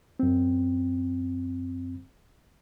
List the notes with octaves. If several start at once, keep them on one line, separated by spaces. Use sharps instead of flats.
F#2 C4